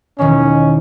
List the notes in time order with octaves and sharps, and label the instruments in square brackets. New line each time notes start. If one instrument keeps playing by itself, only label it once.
[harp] E1 D#3 G#3 [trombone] C#4